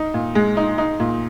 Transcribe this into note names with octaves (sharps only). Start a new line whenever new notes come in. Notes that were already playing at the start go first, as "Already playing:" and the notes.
Already playing: D#4
A#2
G#3
D#4
D#4
A#2